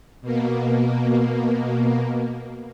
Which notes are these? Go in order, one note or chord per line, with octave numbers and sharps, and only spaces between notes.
B2 A#3